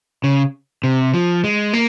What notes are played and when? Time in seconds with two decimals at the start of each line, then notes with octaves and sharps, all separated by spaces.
0.24 C#3
0.84 C3
1.14 F3
1.44 G#3
1.73 A#3